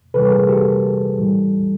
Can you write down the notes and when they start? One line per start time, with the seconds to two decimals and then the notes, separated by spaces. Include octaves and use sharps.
0.14 C3 E3 G3 A4 B4
0.31 G#4 A#4
0.49 G4 A4
1.18 A2 E3 G3